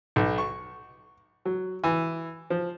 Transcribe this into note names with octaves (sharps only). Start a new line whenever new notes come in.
B1
C#6
F#3
E3
F3